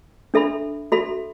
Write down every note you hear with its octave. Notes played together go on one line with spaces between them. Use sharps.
D4 A4 E5 B5
F#4 A4 E5 B5